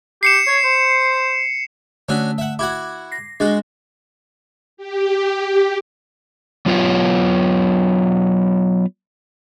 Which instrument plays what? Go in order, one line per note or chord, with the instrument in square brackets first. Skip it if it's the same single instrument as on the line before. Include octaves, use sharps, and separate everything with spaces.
[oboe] G4 [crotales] C7 C#7 E7
[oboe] C#5
C5
[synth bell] D3 A3 [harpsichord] C#4 D4 F#4
[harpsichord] E5 F#5
[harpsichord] E4 F#4 F#5 [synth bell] D6 G#6
[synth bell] A#6 C7
[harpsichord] G#3 F#4 [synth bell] D4
[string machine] G4
[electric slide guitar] F#3 B3 F4 B4 C#5